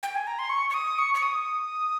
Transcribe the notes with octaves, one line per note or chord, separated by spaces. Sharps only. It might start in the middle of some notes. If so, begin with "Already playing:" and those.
G5
G#5
A#5
C6
C#6
C#6
D#6
C#6
C#6
D#6